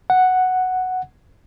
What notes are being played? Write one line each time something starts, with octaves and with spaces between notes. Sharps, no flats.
F#5